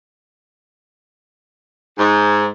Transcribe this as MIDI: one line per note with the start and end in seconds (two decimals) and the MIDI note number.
1.98 2.45 44